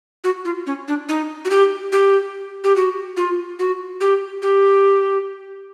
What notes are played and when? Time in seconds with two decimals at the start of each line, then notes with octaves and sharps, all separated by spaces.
0.24 F#4
0.45 F4
0.67 C#4
0.88 D4
1.09 D#4
1.45 F#4
1.50 G4
1.92 G4
2.64 G4
2.76 F#4
3.17 F4
3.59 F#4
4.01 G4
4.42 G4